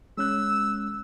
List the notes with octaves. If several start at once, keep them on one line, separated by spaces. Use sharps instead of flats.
G#3 C#4 E6 F#6